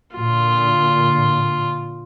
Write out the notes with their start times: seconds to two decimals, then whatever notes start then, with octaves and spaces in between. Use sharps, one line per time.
0.15 A#2 D3 F4